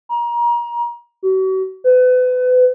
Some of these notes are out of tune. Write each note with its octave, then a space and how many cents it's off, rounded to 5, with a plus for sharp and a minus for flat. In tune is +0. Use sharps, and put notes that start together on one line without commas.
A#5 +30
F#4 +40
B4 +35